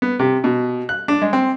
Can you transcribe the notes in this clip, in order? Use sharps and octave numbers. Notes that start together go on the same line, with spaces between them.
B3
C3
B2
F#6
D4
G#3
C4